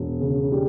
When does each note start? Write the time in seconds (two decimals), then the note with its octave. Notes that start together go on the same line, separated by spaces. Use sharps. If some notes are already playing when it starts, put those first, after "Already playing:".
Already playing: E1
0.20 C#3
0.52 G3